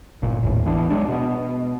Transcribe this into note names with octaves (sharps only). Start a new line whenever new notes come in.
G1 A#2
D1 G1 D#2 A2
E3 B3 D4
F#3 G#3 D4
B2 B3